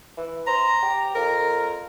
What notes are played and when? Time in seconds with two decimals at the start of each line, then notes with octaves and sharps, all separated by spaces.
0.17 E3
0.47 C5 A#5
0.83 G4
1.16 F2 A#4